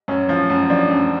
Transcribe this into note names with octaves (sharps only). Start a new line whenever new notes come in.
F#2 C#4
F3
F#2
F3 D4
F#2